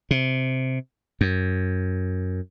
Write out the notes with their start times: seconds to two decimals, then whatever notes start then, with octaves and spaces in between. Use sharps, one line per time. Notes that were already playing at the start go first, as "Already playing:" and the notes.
0.11 C3
1.21 F#2